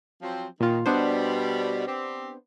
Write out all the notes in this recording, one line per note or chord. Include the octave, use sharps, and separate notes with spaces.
F3 F#3 C4
A#2 D#3 F4
B2 G3 B3 D4 C5
C4 G4